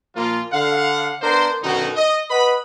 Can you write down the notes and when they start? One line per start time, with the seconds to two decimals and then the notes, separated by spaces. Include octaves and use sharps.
0.16 A#2 F3 A#3 F4
0.53 D3 F5 F#5
1.22 B3 D4 A#4 C5
1.62 F#2 B2 D3 D#3 D#4 F#4
1.96 D#5
2.30 B4 D#5 F#5 B5